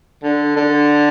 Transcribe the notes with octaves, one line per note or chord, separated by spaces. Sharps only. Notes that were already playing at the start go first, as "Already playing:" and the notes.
D3
D3